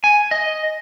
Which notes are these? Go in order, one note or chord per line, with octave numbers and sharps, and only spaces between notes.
G#5
D#5